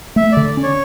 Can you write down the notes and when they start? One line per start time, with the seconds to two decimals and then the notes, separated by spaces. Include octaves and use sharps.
0.16 A3 E5
0.32 D3 D5
0.46 D5
0.57 C#4
0.63 C#5